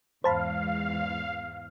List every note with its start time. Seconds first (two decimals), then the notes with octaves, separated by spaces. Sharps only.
0.24 E2 G#2 C5 F5 A5 B5